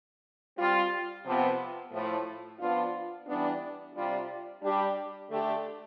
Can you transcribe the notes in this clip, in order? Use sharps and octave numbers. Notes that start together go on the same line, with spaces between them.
G3 C4 F4
C3 F3 B3
A2 F3 A3
F3 B3 D4 F4
E3 G3 B3 D4
C3 G3 D4 F4
G3 D4 G4
D3 A3 D4 G4